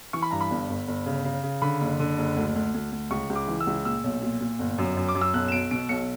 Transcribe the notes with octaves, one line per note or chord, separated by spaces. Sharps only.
E3 C#6
B5
G2 A#5
B5
G1
G1
G1
C#3
C#3
C#3
D3 B5
F#1
D3
F#1
D2
D2
D2
D2
C#2 C#6
C#2
D6
E3
E6
C#2
A#2 E6
B1
A#2
A#2
G1
F#2
F#2
D6
F#2
E6
B1 F#6
E7
B1 D7
B2 D7
B1 C#7